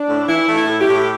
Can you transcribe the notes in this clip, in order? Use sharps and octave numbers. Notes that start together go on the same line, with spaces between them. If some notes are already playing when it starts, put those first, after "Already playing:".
Already playing: D4
A2
E3 E4
A3
E4
A2
G4
A2